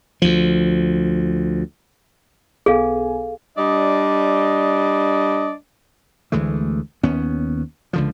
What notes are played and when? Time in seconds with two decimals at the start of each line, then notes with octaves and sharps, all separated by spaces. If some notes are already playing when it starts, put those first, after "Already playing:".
0.22 D2 F3
2.66 B1 B3 G#4 A4 F5 G#5
3.57 G3 D4 D5 D#5
6.32 D2 E3 G#3 A3
7.03 D#2 B3 C#4
7.93 C#2 D3 F3